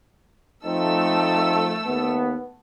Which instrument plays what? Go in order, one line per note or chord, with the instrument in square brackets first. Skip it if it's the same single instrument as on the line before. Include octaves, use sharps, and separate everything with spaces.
[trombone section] F3 C4 D#4 [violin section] A3 A4 E6
[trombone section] D#2 B3